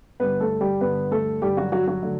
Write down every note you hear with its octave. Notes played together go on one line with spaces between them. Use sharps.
G2 D3 G3 B3 B4
A3 A4
G3 G4
G2 D3 G3 B3 B4
A3 A4
G2 D3 G3 G4
F#3 F#4
F#3 F#4
F#3 F#4
D3 A3